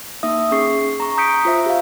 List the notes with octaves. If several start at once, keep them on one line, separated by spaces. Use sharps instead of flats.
A#3 D#4 E5 D#6
C#4 G#4 C#6 C7
A#5 C#6
A#5 D#6 G6 B6 C#7 D7
F4 C5 E5
G4 F5